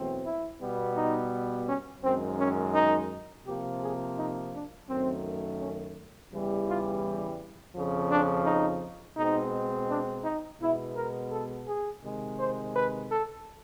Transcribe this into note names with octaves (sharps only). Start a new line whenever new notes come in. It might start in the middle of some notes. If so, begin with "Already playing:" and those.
Already playing: E2 B2 F#3 A3 C4
E4
B2 G3 B3
D#4
C#4
F#2 D#3 G#3 C4
C#4
D#4
C3 F3 A#3 G4
G#4
D#4
D4
F#2 D#3 F#3 A3 C4
C#4
E2 C#3 E3 G3
F4
F2 C#3 F3
D4
D#4
B2 G#3 C4 D#4
D4
D#4
B2 G#3 B3 E4
A#4
A4
G#4
C3 D#3 G#3
C5
B4
A4